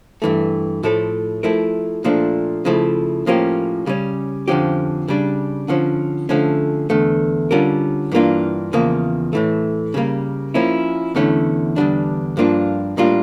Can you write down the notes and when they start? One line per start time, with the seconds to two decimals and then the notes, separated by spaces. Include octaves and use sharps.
0.22 G2 E3 A3
0.83 A2 F3 A3 E4 A4
1.43 F3 A3 E4 A#4
2.04 A#2 F3 A3 D4
2.65 C#3 F3 A3 E4
3.26 A2 F3 A#3 C#4 G4
3.86 C#3 G3 C#4
4.48 F2 D3 F3 C#4 G4
5.08 C#3 G3 D4
5.68 D3 F3 C#4
6.29 D3 F3 A3 C#4
6.90 E2 D3 A3
7.51 D3 G3 C#4 F4 A#4
8.12 G2 E3 A#3 D4 F4
8.73 E2 C#3 F3 A#3
9.33 A2 E3 A3
9.94 C#3 G3 A#3
10.54 F3 A#3 C#4 E4
11.15 E2 D3 A3 C#4 E4
11.76 E2 D3 G3 D4
12.37 G2 F3 A#3 D4 F4
12.97 A2 G3 A#3 D4 F4